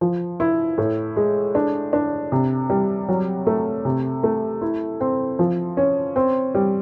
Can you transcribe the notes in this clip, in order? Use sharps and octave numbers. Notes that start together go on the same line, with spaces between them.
F3
E4
A2
G#3
D4
D4
C3
G3
F#3
A3
C3
A3
E4
C4
F3
C#4
C4
G3